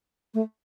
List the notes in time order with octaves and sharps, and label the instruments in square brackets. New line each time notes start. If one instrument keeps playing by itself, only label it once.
[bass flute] A3